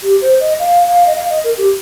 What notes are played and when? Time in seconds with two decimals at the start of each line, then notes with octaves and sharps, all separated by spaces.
0.03 G4
0.21 C5
0.40 D#5
0.59 F5
0.87 F5
1.07 D#5
1.15 F5
1.30 D#5
1.44 A#4
1.58 G4